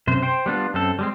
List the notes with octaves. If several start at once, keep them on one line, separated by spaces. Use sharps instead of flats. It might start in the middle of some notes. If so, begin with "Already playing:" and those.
F#2 C3 C5
C5 G5
G3 B3 D4 F4
F#2 C4 A4
G3 G#3 C4